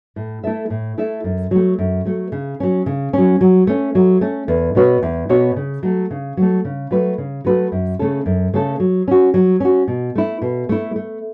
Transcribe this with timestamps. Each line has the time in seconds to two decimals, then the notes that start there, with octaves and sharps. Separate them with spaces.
0.16 A2
0.44 A3 E4 A4 E5
0.70 A2
0.98 A3 E4 A4 E5
1.24 F#2
1.51 F#3 A3
1.79 F#2
2.05 F#3 A3
2.32 C#3
2.60 F#3 C#4
2.86 C#3
3.13 F#3 C#4
3.41 F#3
3.67 A3 C#4
3.95 F#3
4.21 A3 C#4
4.48 E2
4.75 B2 B3 F#4 C#5
5.03 E2
5.29 B2 B3 F#4 C#5
5.56 C#3
5.83 F#3 A3
6.11 C#3
6.37 F#3 A3
6.65 C#3
6.91 F#3 A3 F#4 B4
7.18 C#3
7.45 F#3 A3 F#4 B4
7.72 F#2
7.99 C#3 A3 C#4 A4
8.26 F#2
8.54 C#3 A3 C#4 A4
8.80 F#3
9.08 C#4 F#4
9.34 F#3
9.60 C#4 F#4
9.88 B2
10.15 A3 E4
10.42 B2
10.69 A3 E4
10.96 A3